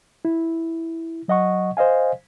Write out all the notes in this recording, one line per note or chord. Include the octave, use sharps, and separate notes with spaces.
E4
F#3 D#5 F#5 C#6
C5 D#5 F5 G#5